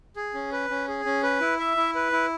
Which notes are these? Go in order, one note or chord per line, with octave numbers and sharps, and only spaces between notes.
G#4
C#4
B4
C#4
G#4
C#4
B4
E4
E5
E4
B4
E4